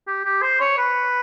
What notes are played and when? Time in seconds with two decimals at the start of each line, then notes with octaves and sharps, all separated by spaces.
0.07 G4
0.25 G4
0.42 C5
0.61 C#5
0.78 B4